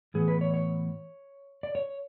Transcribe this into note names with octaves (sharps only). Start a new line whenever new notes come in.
A2 E3 B3 G#4
B4
C#5
C#5
D5
C#5